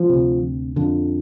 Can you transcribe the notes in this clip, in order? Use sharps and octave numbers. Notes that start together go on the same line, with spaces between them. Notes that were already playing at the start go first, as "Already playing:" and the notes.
Already playing: F3
D2 C3
F2 D3